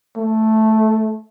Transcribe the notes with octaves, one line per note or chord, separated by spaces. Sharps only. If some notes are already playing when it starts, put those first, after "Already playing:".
A3